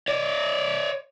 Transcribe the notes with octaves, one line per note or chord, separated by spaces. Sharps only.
C#5 D5